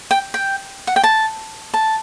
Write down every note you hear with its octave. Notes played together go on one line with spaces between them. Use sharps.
G5
G5
F#5
G5
A5
A5